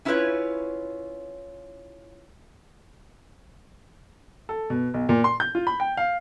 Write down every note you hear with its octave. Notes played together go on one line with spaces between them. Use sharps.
C#4 E4 F4 A#4 B4 C#5
A4
B2
B1
A#2
C6
G6
F4
B5
G5
F5